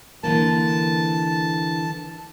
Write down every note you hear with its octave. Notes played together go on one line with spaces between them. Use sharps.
D3 E3 A#3 A5